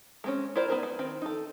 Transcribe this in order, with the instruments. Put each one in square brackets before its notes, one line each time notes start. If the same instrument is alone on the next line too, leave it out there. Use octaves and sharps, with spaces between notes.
[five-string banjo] G#3 C4 C#4
E4 F4 A#4 C5 D5
B3 D#4 A#4 C5
B3
D#3 C4
D#4 A4